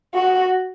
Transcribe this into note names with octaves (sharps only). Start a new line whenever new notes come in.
F#4